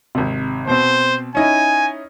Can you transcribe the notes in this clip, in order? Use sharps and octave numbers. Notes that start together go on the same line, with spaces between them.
G#1 C3
B2 C4 C5
C#4 D#4 E4 G#5